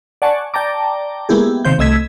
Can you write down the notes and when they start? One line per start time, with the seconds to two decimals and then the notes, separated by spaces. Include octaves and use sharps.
0.22 D5 F#5 G#5 A5 C#6
0.54 D5 G5 A5 A#5 D6
1.29 G#3 A#3 B3 E4 G4 G#4
1.65 C3 D#3 C5 F5 G6
1.78 C2 A3 D#5 E6 G#6 B6